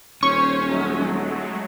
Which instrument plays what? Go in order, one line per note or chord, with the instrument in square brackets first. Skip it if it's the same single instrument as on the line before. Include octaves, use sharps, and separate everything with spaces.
[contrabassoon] D#1 [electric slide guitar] C#4 [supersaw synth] C5 C#5 [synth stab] C#6
[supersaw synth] F#3 G#3 A3